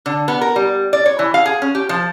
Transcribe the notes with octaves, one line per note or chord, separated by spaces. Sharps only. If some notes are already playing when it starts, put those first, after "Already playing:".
D3
B3
A#4
G3
D5
C#5
E3
F5
G#4
C#4
G4
F3